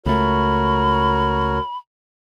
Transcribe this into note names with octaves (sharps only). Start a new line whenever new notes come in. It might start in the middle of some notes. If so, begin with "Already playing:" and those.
C#2 A3 F#4 A#4 C#5 B5